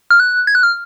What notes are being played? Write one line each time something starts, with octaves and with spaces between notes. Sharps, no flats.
F6
F#6
G#6
F#6
F6